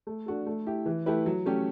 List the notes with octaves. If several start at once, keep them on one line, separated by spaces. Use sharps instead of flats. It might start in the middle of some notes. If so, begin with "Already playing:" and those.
A3
D4 F#4 A4
A3
E4 G4
E3
A3 E4 G4 B4
F#3
A3 C#4 G4